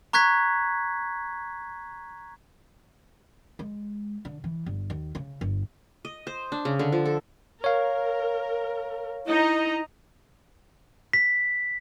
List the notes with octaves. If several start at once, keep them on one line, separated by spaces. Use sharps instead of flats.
A#5 C#6 F#6 G#6 B6
G#3
D3
E3
G1
D#2
C#3
G1
D#5
C5
D4
C#3
D3
F3
A4
A#4 C#5 F5
D#4 E4 D#5 A#5
B6